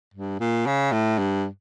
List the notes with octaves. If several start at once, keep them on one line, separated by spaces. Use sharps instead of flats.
G2
A#2
C#3
A2
G2